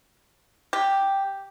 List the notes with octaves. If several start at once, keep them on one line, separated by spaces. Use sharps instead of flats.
G4